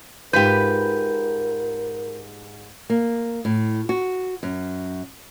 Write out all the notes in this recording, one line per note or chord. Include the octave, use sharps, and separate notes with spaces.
G#2 F4 G4 A#4 B4 G6
A#3
A2
F#4
F#2